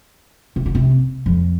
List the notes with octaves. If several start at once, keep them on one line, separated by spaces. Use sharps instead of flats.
C3
D3
C3
F2